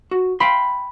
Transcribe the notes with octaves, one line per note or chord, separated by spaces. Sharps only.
F#4
F5 G5 B5 C6